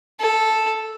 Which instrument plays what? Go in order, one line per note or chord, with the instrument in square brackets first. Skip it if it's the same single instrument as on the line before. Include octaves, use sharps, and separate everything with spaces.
[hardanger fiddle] A4